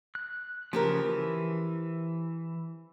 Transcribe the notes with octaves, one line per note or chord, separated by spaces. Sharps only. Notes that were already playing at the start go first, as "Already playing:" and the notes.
F#6
C#3 F3 C4 G4 A#4
E3